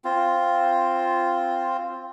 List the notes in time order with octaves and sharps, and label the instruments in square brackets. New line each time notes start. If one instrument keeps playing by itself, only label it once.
[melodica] C4 F4